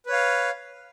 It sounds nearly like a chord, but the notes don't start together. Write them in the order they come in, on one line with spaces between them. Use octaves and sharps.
B4 C#5 F5